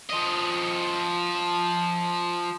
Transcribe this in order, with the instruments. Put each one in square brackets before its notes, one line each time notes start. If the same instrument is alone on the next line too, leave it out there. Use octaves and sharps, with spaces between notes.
[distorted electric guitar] F3 D#5